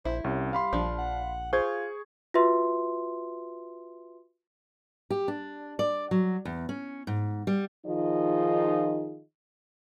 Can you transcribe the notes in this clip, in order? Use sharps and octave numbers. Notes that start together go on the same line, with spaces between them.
A#1 E4 C5
C2 G3 C#4
F5 B5 C6
A#1 F3 D4
F#5
F4 G#4 C5 C#6 G#6
F4 F#4 B4 E5 C6
G4
D4
D5
F#3
E2
C#4
G#2
G3
D#3 F3 D#4 F4 G#4 D#5